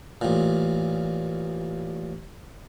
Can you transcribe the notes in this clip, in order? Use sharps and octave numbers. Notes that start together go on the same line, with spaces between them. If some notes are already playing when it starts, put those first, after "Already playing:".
A1 A#2